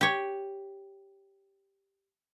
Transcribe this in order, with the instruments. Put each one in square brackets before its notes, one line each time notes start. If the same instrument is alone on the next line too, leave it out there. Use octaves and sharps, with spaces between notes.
[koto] G4 C#5